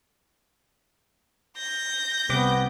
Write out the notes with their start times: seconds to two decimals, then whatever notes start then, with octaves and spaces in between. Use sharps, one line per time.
1.58 G6 A#6
2.29 C2 B3 C4 D6